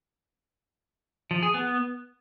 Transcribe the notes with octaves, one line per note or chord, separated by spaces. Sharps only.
F3
G#4
B3